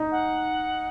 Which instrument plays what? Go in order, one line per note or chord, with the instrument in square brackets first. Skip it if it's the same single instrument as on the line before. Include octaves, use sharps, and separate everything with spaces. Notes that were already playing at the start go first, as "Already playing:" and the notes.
Already playing: [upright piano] D#4
[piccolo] F#5